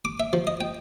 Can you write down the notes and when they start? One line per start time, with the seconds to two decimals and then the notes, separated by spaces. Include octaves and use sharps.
0.05 D6
0.20 E5
0.33 F3
0.47 D#5
0.61 G5